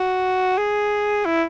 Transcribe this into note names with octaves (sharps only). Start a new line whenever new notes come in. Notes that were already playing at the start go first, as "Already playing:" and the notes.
Already playing: F#4
G#4
E4